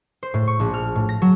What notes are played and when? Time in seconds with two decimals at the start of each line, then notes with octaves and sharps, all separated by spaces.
0.23 C5
0.34 A2
0.47 C#6
0.60 A#1
0.74 F6
0.95 A2
1.09 A#6
1.22 F#3